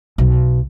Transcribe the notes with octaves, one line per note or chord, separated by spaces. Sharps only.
B1